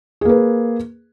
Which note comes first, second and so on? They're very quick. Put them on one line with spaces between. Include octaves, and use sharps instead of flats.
G#4 A#3 B4